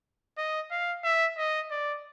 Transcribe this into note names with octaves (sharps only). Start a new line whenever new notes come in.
D#5
F5
E5
D#5
D5